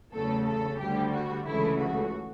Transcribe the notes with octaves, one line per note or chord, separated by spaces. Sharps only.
E2 C#3 F#3 A3 A4
A4
D2 D3 G3 G4
F#4
C#2 C#3 E3 A3 E4
F#4